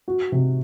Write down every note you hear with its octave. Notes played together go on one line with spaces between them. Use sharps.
F#4
C3